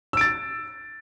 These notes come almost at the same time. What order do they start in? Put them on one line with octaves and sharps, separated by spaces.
E6 D7 A6